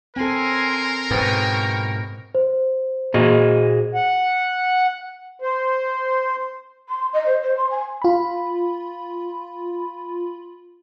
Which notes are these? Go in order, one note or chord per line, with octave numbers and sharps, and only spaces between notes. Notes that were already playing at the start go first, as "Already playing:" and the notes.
C4 A4 A#4 G#5 C6
G#2 B2 B4 C5 G5 C#6
C5
A#2 F#4 G#4 D#5
F#5
C5
C6
D#5
C5
C5
C6
G#5
F4 B5